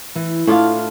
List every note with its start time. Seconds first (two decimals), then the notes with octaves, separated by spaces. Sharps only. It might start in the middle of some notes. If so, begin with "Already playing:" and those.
0.15 E3
0.47 A2 D4 E4 F4 F5